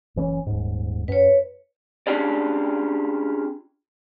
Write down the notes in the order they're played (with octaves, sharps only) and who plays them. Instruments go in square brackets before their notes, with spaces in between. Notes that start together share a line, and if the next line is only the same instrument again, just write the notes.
[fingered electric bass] F#1 E3 C#4
D#1 G#2
[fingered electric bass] F#2 [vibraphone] B4 C#5
[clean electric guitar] C#4 D4 F4 G4 G#4 D5